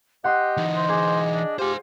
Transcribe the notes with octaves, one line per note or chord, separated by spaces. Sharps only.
G4 D#5 F#5 C6
E3 D#4
C5
G#4 D6
D4
F4 G4 C5 G#5